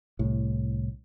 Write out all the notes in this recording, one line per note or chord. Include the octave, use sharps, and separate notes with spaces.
C2 A2